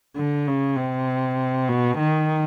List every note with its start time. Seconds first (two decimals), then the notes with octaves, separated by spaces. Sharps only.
0.16 D3
0.47 C#3
0.77 C3
1.68 B2
1.98 D#3